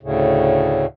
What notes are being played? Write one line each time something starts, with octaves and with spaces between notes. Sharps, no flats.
D2 A2 C#3